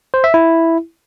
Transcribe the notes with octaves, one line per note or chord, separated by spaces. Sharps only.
C5
E5
E4